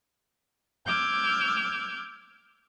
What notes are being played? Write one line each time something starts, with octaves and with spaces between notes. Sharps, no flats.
D6 E6 F6 G6 G#6